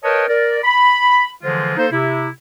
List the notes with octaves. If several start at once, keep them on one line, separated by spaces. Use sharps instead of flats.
A#4 B4 C#5 D#5 G5 A5
A#4 D5
B5
D3 E3 F3 G#3 F4 C5
A#3 D#4 A4 C5
C3 E4